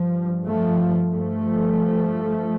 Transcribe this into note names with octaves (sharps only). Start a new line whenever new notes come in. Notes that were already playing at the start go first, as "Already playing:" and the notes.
Already playing: G2 F3
F3 A3
G2 F3 A3